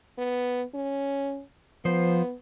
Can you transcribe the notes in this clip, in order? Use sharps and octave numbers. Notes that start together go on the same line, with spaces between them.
B3
C#4
F3 B3 C5